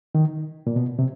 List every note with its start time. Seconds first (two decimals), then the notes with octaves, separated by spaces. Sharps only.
0.15 D#3
0.67 A#2
0.76 B2
0.99 C3